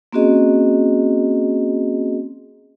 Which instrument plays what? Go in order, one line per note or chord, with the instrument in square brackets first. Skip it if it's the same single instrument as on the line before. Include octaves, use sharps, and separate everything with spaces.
[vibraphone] A#3 C4 C#4 F#4 G#4 D#5